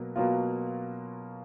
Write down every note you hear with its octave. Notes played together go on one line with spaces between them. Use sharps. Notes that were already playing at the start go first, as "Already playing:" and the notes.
Already playing: B2 F#3 A#3
B2 F#3 A#3 F4